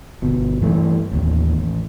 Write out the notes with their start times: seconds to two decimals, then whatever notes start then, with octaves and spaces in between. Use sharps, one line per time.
0.22 G1 B2
0.61 G2 E3 A3
1.12 A1 D#2
1.58 A1